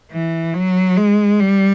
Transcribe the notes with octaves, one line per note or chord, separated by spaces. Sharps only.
E3
F#3
G#3
G3